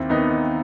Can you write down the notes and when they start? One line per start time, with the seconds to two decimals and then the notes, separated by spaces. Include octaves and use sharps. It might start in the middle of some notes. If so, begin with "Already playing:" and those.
Already playing: D#2 C4 E4
0.10 D#3 B3 D#4